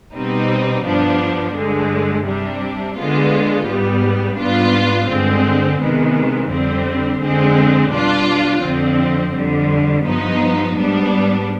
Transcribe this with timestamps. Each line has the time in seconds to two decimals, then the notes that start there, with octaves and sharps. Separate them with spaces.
0.13 B2 G3 C4 D#4
0.85 G2 F3 B3 D4
1.54 G2 D3 G#3
2.26 C3 G3 D4
2.97 D3 G#3 B3 F4
3.67 G#2 G3 B3
4.38 G#2 G3 B3 D4 F4
5.08 G2 D3 G#3 C4
5.80 C3 D#3 G#3 B3
6.50 F2 D3 G3 C4
7.21 F2 D3 G#3 C4
7.92 B2 G3 D4 F4
8.63 F2 D3 F3 C4
9.34 F2 D3 G3
10.05 G2 F3 B3 D#4
10.75 G#2 G3 B3 D4